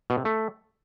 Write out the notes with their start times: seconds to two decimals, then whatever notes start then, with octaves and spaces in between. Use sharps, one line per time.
0.10 B2
0.18 C3
0.25 A3